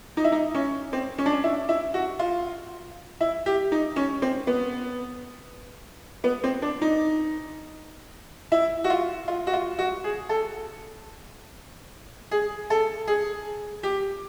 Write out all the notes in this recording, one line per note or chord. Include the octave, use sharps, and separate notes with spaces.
D#4
E4
D#4
C#4
C4
C#4
D4
C#4
E4
E4
F#4
F4
E4
G4
D#4
C#4
C4
B3
B3
C4
D4
D#4
E4
F#4
F4
F4
F#4
F4
F#4
G#4
A4
G#4
A4
G#4
G4